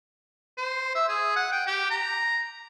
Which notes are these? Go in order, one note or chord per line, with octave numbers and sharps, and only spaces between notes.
C5
E5
G#4
F#5
G5
G4
A#5